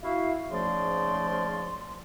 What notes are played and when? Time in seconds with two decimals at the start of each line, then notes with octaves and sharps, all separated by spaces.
0.02 E4 F#4 F5
0.52 G#2 C#3 F3 A3 D5 C6